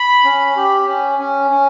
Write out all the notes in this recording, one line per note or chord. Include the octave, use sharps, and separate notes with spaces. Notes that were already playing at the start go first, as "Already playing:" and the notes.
Already playing: B5
C#4
G4
C#4
C#4
C#4